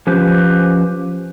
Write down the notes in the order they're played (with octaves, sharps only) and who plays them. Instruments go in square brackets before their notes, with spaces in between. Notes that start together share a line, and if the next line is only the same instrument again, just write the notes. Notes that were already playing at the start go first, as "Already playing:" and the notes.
[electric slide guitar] F3 C#4 G4 B4 C5